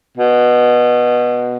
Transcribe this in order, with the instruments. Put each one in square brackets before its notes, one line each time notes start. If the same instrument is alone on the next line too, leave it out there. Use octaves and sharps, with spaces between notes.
[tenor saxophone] B2